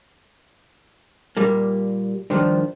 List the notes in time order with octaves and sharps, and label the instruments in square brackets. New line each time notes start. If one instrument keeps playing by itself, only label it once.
[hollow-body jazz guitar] A#2 G3 A#3
[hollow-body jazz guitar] G2 D#3 F3 [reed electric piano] D4 C5